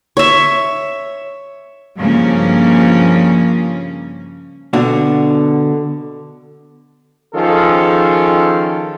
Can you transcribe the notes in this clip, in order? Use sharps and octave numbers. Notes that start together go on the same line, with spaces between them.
C#5 E5
G2 C#3 F3 A#3 C#4
B2 D3 D4 F#4
D#3 F3 C#4 F4 G#4 A4